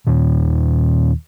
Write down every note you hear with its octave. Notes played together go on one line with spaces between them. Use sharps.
D#2 A#2 D#3